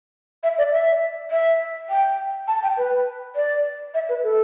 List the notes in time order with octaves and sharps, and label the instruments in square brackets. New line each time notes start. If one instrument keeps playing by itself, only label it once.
[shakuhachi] E5
D5
E5
E5
G5
A5
G5
B4
D5
E5
B4
A4